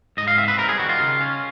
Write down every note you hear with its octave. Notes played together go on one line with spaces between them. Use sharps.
G#2 D#5
F5
C4 E5
B4
G3 A#4
G#4
D#3 F#4
F4
C#3
C#4